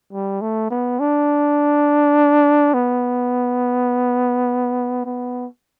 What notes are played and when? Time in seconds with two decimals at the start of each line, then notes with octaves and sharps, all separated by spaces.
0.13 G3
0.41 A3
0.70 B3
1.00 D4
2.74 B3
5.05 B3